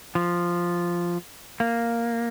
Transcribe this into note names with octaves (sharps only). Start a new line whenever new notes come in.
F3
A#3